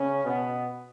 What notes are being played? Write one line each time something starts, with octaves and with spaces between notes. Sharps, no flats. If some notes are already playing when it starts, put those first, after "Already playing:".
Already playing: C#3 C#4
B2 B3